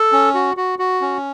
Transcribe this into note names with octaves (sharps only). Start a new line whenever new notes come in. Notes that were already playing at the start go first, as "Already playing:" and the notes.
Already playing: A4
C#4
F#4
F#4
F#4
C#4